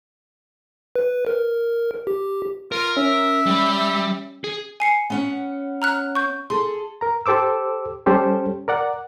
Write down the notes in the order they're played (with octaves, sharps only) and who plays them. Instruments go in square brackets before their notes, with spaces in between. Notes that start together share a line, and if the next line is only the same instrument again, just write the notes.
[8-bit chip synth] B4
A#4
G4
[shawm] F4 [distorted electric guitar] A#4
[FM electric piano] C#4 [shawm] E5
[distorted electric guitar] G3 B5
G#4
[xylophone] G#5 C7 C#7
[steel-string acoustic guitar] B3 C#4 F#5
[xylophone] A#5 F6 F#6
C#6 G6
[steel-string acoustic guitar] G#4 A4 [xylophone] C6
[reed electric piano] A#4 A#5
G4 A4 C5 D6 E6
G3 C#4 G4 A4 C5
A#4 D5 F#5